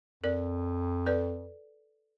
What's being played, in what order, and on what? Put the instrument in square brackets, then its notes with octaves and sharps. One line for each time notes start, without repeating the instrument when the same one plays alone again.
[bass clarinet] F2 [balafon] A#4 D5
[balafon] A4 B4 D5